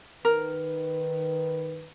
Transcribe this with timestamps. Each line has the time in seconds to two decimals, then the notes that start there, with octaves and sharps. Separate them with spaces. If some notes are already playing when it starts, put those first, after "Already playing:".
0.25 D#3 A#4 B4